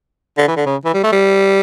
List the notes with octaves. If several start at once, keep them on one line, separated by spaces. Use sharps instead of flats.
D3
E3
D3
C#3
E3
G3
A3
G3